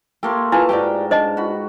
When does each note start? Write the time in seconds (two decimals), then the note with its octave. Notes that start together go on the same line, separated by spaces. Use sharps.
0.23 A3 A#3 G4 C6
0.52 E4 F4 G#4 B4 F5 A5
0.69 G#2 G4 D5 G5 A#5
1.11 D4 C5 D#5 A5
1.37 F#4 B5